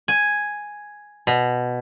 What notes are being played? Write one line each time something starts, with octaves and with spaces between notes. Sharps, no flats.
G#5
B2